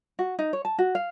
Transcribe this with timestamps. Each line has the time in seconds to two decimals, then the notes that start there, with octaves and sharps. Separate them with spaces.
0.19 F#4
0.39 D#4
0.53 C#5
0.65 A5
0.78 F#4
0.95 F5